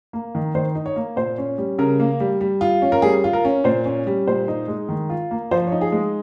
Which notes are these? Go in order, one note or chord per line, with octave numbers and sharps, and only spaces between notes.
A#3
D#3
D#3 C5
D#4
C#5
A#3
A#2 C5
C#4
G3
C#3 A#4
A#3
G3
G3
F4
C#4
A#4
G3 G#4
F4
A#4
C#4
A#2 C5
C#4
G3
A#2 C5
D#4
G#3
D#3
F4
A#3
F3 C5
C#5
D#4
G#4
G#3